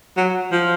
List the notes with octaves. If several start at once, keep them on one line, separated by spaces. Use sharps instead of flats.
F#3
F3